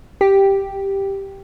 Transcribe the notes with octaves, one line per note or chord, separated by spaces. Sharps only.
G4